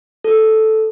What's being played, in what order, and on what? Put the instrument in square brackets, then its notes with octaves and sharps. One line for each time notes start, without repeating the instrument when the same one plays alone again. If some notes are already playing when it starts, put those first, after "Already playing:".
[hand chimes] A4